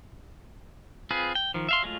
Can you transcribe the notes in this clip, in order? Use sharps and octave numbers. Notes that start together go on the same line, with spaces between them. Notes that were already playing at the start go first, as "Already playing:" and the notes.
C4 F4 G#4 B4
G5
D#3 F3
E5 F5 C6
F#3 G#3 A3 F4